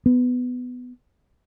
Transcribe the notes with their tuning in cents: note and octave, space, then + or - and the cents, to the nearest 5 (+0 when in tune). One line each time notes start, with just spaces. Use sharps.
B3 +10